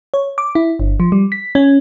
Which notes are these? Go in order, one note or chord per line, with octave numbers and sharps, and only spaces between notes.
C#5
D6
E4
G1
F3
G3
B6
C#4